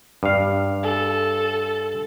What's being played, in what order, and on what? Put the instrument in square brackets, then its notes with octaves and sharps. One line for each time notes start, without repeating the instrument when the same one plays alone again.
[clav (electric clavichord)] G2 F5
[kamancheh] A4